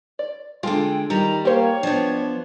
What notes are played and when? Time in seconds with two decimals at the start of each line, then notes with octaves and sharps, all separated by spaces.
0.19 D5
0.63 D3 G#3 F4 A4 G5
1.10 D#3 G3 A#5
1.45 A#3 G4 C5 C#5
1.83 F3 B3 D4